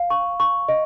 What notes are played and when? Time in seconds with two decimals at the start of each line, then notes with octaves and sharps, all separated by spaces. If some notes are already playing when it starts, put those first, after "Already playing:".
Already playing: F5
0.10 C#6
0.40 C#6
0.68 D#5